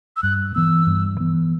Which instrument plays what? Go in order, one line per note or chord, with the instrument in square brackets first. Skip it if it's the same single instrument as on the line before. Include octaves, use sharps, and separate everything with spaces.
[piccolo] E6
[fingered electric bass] G2 [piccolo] F#6
[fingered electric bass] E3 B3 [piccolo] E6
[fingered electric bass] G2
E3 B3